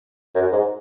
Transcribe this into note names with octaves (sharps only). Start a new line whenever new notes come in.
F#2
G#2